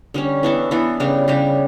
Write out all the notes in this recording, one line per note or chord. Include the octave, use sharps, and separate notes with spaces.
D3 G3 C#4
E3 B3 D4 A4
E3 B3 D4 A4
C#3 G3 D4 G4
C#3 G3 D4 G4